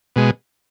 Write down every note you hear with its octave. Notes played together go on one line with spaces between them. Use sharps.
B2 G#3